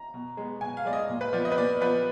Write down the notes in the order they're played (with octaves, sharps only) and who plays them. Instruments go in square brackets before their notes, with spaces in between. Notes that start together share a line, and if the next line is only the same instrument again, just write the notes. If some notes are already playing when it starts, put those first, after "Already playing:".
Already playing: [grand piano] A#5
B2
G#3 B3
B2 G#5
F5
G#3 B3 D5
D#5
A#2
B4
F3 B3 D5
D#5
B4
A#2 D5
F3 B3 B4